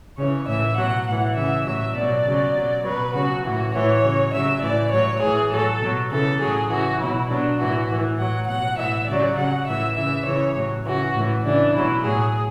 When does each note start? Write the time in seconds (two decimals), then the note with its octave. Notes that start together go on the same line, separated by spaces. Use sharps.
0.18 C#3 E3 C#5
0.47 A2 E3 E5
0.77 B2 F#3 F#5
1.07 A2 E3 F#5
1.36 C#3 E3 E5
1.66 A2 F#3 E5
1.95 B2 F#3 D5
2.25 C#3 F#3
2.55 B2 F#3
2.84 B2 F#3 B4
3.14 C#3 F#3 F#4
3.44 A2 E3 F#4
3.74 A2 E3 C#5
4.04 C#3 F#3
4.33 C#3 F#3 E5
4.62 A2 E3 D5
4.92 A2 F#3 C#5
5.22 A2 E3 G#4
5.51 A2 F#3 A4
5.82 B2 F#3
6.11 C#3 E3 A4
6.41 A2 F#3 G#4
6.70 C#3 E3 F#4
7.00 B2 F#3 E4
7.29 B2 F#3 D4
7.60 A2 E3 F#4
7.90 A2 E3
8.18 A2 F#3 F#5
8.48 B2 F#3 F#5
8.78 A2 E3 E5
9.08 C#3 F#3 D5
9.37 C#3 F#3 F#5
9.67 A2 E3 E5
9.96 C#3 E3 E5
10.26 C#3 E3 C#5
10.55 A2 F#3
10.86 C#3 E3 F#4
11.15 A2 E3
11.45 C#3 E3 D4
11.74 B2 F#3 E4
12.04 A2 F#3 G#4